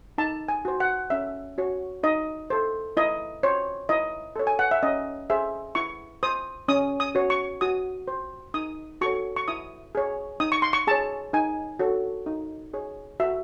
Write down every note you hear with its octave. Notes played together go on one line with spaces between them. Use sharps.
D#4 A5
G#5
F#4 C5
F#5
C#4 E5
F#4 C#5
D#4 D#5
A4 C5
E4 D#5
C5 C#5
E4 D#5
A4 C#5
G#5
F#5
E5
C#4 D#5
G#4 C5 E5
E4 C#6
C5 D#6
C#4 D#6
D#6
F#4 C#5
C#6
F#4 D#6
C5
D#4 D#6
F#4 A4 C#5 C#6
C#6
E4 D#6
G#4 C#5
D#4 D#6
C#6
C6
C#6
G#4 C#5 A5
D#4 G#5
F#4 A4 C#5
D#4
G#4 C#5
F#4 E5